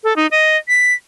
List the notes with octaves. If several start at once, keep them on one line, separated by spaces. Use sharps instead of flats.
A4
D#4
D#5
B6